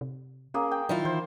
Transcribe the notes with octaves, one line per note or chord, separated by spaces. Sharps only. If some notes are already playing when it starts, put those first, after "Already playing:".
C3
A#3 C#4 G#4
G5
D#3 F#3 E4 F4
E3 C5